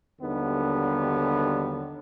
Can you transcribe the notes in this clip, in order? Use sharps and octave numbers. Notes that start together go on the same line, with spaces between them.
D#2 D3 D#3 F#3 G3 B3